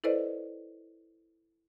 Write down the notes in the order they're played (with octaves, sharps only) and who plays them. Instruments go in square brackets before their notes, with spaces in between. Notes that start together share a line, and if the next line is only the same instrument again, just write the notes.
[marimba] E4 A4 B4 C5 D5 D#5